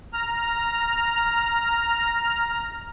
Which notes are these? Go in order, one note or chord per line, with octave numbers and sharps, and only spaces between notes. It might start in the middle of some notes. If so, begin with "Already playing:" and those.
A#5 F6